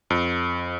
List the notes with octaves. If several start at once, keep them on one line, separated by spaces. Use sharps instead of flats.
F2